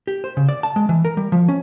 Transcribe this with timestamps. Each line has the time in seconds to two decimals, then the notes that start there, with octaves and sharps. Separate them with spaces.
0.07 G4
0.24 C5
0.37 C#3
0.49 D5
0.63 A5
0.76 G#3
0.89 E3
1.05 A#4
1.17 G3
1.32 F3
1.49 C#4